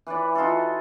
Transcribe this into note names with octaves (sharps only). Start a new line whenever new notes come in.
E3 B4 C#5 D5
D#4 F4 F#4 A4